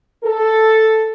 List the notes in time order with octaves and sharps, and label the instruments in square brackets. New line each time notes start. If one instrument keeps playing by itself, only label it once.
[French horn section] A4